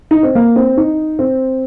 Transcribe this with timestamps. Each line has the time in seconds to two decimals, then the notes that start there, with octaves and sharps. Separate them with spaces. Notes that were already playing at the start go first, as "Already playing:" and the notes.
0.11 D#4
0.23 C4
0.35 A#3
0.56 C4
0.77 D#4
1.19 C4